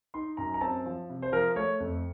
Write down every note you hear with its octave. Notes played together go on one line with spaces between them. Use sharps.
D#4 C6
F#2 A#5
A#5
C4 A5
F3
C3
C5
F3 A#4
A3 C#5
F2